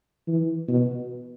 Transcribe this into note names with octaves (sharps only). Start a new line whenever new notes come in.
E3
B2